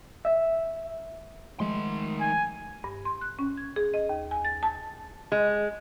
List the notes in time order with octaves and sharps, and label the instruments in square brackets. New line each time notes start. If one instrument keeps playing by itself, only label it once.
[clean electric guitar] E5
[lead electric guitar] D#3 C6 [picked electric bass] F3 G#3 A3
[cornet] G#5
[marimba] G2
C6
F#6
C#4
G#6
G#4
D#5
D#2
G#5
A6
A5
[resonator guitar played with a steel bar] G#3